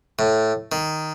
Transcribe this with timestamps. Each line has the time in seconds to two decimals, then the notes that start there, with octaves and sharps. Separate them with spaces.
0.19 A2
0.72 D#3